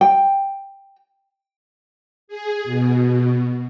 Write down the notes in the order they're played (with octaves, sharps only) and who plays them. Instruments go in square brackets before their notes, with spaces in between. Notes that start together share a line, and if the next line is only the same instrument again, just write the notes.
[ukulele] G5
[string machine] G#4
B2